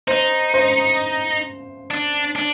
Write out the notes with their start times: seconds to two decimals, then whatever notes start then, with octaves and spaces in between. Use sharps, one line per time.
0.07 D#4 C5
0.54 C5
1.91 D4
2.36 D4